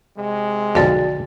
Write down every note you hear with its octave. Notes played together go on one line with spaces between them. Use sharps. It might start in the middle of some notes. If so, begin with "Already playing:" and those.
C3 G#3
B1 F2 D3 F#4 D5 A5 A6